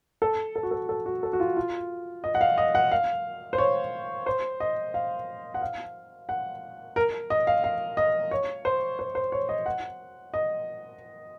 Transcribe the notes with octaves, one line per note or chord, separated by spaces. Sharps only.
A4
A4
F#4
A4
A4
F#4
A4
F#4
F4
F4
D#5
F#5
F5
D#5
F#5
F5
C5
C#5
C5
D#5
F5
F#5
F5
F#5
A#4
D#5
F5
F5
D#5
C#5
C5
C5
C5
C#5
D#5
F#5
D#5